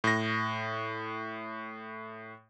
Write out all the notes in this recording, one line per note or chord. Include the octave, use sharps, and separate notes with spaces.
A2 A#6